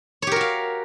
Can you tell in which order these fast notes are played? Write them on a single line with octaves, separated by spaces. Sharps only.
C#5 G4 A#4 F#4 F5